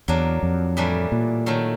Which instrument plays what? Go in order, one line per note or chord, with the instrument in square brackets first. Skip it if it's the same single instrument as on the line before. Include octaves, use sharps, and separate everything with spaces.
[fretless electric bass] E2 [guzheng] F#3 A#3 D4
[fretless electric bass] F2
[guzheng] A2 E3 G3 A#3 D4
[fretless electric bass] A#2
[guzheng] D#3 F#3 A3